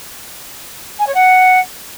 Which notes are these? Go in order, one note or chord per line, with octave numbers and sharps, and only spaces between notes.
G#5
C#5
F#5